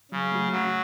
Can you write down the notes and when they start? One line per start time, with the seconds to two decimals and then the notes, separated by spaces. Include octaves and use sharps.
0.11 C#3 F#3
0.32 A3 F#4
0.52 F#3 A3